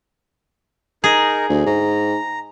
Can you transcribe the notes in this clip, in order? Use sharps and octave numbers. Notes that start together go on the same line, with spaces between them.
D#4 G#4 A#4
D2
G#2 A#5